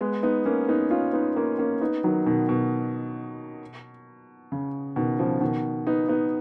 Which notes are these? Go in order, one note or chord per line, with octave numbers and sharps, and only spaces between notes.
G#3 B3
B3 D#4
A#3 C#4
B3 D#4
C#4 F4
B3 D#4
A#3 C#4
A#3 C#4
B3 D#4
D#3 F#3
B2 D#3
B2
C#3
B2 D#3
C#3 F3
B2 D#3
B3 D#4
B3 D#4